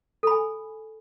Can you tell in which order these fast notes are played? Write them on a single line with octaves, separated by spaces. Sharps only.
A4 B5 G#5